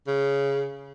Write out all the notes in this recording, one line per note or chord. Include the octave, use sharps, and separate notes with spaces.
C#3